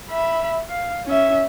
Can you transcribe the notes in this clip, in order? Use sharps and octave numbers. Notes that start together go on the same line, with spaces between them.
E5 B5
F5
C#4 E5